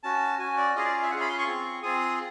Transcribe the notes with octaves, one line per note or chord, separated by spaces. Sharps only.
C#4 F#4 A5
C#4 F#4 G#5
D5
C#4 F4 G#4 D#5
D5
E5
C#4 F4 G#4 F#5
B5
C6
C#6
C4 F4 G#4
C4 F4 G#4 D#6